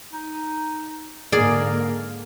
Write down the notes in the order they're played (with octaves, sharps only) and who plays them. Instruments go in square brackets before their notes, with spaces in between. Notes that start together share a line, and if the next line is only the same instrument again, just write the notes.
[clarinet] D#4
[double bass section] G#2 D3 A#3 [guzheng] G#4 D5 [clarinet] A#4